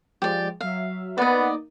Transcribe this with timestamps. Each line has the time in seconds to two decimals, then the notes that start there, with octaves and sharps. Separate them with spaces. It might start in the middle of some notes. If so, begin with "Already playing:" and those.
0.22 F3 G#3 G4 D5
0.60 F#3 E5 F5
1.18 A#3 B3 D#4 D5 D#5